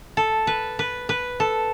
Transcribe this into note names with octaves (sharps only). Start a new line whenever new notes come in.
A4
B4
B4
B4
A4